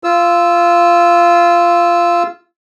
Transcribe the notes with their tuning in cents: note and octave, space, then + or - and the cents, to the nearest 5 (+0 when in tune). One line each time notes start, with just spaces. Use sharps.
F4 -15 E6 +0